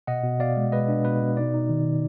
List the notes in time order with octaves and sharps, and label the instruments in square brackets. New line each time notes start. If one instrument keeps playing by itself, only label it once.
[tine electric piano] B2 D#5 F#5
B2
B2 D5 F5
G#3
G#3 B4 D#5
D4
B2 B4
B2
D#4 D5
D#4
D#3
D#3